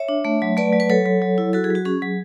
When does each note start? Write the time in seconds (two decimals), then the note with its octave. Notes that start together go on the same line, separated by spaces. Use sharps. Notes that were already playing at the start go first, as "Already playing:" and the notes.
Already playing: C#5 E5
0.08 D4
0.25 A3
0.42 F#3
0.57 A3 B4 D5
0.73 F#3
0.80 B4
0.90 F#3 A4 C#5
1.06 F#3
1.22 F#3
1.38 E4
1.53 F#3 F#4 A4
1.64 G#4
1.70 F#3 F#4
1.85 C#4 G#4
2.02 F#3